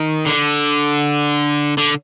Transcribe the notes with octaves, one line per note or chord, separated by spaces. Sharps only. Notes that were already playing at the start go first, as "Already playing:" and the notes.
Already playing: D#3
D3
D3